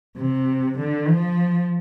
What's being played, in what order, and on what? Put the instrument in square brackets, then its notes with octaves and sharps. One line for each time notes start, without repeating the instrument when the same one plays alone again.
[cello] C3
D3
F3